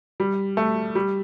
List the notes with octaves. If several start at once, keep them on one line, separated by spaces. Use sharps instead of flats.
G3
A3
G3